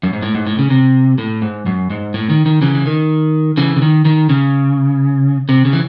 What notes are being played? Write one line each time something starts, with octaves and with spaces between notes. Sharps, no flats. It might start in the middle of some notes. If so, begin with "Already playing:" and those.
F#2
G#2
A2
G#2
A2
C#3
C3
A2
G#2
F#2
G#2
A2
D#3
D#3
C#3 E3
E3
D#3
C#3 E3
C#3
D#3
D#3
C#3
C3
C#3
E3